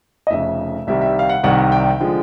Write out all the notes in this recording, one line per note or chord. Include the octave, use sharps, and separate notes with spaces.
D#5
F1 F2 C#3 E5
C2 C3 D#3 G3 E5
E5
F5
F#5
C2 C3 D#3 G3 F#5
G5
D3 F3 G#3